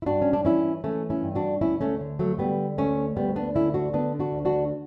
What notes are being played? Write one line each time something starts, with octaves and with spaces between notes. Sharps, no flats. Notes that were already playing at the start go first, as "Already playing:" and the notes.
E4
G2 D4 F#4
C#4
D4
E3 C#4 E4
E3 A3 C#4
C#4 E4
G2
D4 F#4
D2 C#4 E4
A3 C#4
D3
F#3 A3
D3 G3 B3
D2 A3 C#4
D2 G3 B3
B3 D4
D3 C#4 E4
D4 F#4
D3 B3 D4
D4 F#4
D2
D4 F#4